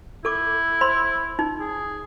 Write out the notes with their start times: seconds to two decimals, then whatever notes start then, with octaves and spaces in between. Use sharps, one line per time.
0.25 E4 A4 D6
0.81 C5 B5 C6
1.39 D#4
1.60 G#4